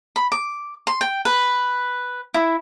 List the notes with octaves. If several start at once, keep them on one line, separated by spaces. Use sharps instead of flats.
B5
D6
C6
G5
B4
E4